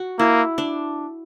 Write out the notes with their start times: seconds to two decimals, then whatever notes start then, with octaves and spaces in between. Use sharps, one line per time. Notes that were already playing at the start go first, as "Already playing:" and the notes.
Already playing: F#4
0.19 A#3 E4
0.58 D4